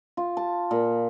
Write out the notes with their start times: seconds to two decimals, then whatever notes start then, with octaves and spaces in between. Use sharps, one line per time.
0.17 F4
0.37 A5
0.71 A#2